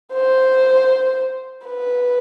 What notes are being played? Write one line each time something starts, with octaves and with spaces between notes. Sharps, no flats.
C5
B4